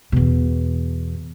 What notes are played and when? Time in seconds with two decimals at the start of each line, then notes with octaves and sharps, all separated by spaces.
0.12 E2 B2